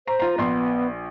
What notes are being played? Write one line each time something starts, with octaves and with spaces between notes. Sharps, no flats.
C5 A#5
F4 A#5
A#1 B3 C6